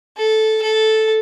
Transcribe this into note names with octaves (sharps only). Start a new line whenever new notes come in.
A4
A4